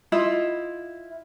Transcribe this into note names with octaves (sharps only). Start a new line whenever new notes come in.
E4 F4 D#5